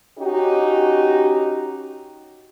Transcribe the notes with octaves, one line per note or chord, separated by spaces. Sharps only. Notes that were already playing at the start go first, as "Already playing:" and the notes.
C#4 D#4 F#4 G4